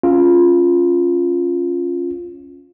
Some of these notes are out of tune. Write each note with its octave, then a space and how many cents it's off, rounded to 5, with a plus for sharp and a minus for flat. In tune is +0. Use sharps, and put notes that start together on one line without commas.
C#4 -5 F4 +0